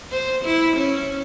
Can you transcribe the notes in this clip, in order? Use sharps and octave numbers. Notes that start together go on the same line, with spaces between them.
C5
E4
C#4